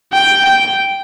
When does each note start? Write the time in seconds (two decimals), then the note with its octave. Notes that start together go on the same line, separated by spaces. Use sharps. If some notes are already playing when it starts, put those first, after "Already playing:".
0.13 G5
0.45 G5